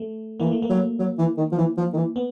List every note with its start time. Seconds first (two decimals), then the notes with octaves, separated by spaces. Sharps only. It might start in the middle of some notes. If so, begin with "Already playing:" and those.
Already playing: A3
0.40 E3 A#3
0.51 A3
0.62 A#3
0.70 F#3
0.99 F#3
1.19 E3
1.37 D#3
1.52 F3
1.58 E3
1.77 F3
1.93 D#3
1.97 E3
2.16 B3